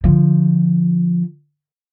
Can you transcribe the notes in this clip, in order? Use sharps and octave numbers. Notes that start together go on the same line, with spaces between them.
D3 F3